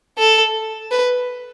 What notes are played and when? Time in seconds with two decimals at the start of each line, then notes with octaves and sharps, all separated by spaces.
0.18 A4
0.91 B4